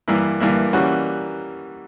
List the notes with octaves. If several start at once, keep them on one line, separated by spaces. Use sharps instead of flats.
G2 E3 A#3 E4
G2 E3 A#3 E4
E3 G3 A#3 C#4 F#4